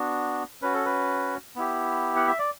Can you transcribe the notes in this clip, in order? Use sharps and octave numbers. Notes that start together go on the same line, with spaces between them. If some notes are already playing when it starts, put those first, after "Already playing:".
Already playing: B3 D4 F#4
C#4 F#4 B4
A4
B4
B3 E4 G4
F#5
E5
D5